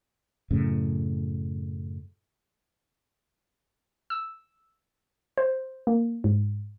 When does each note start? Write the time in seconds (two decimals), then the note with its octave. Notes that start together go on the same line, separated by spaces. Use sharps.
0.51 F#2 A2 C#3
4.10 E6
5.38 C5
5.87 A#3
6.24 G#2